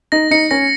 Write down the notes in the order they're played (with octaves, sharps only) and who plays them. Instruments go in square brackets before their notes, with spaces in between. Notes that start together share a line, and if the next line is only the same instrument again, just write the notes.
[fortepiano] D#4 [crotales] A#6
[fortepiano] D#4 [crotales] C#7
[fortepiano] C#4 [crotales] A#6